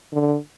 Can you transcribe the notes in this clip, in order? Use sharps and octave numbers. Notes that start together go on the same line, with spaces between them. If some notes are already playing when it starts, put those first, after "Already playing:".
D3